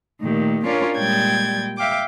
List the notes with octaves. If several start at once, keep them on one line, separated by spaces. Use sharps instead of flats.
A#2 D#3 A3 G4
C#4 D4 F4 A#4 C#5 D5
A#2 G3 G#3 G5 G#6 A6
E5 F5 G5 D6